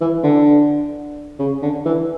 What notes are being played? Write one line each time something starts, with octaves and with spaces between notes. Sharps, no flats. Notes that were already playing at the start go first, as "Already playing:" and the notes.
E3
D3
C#3
D3
E3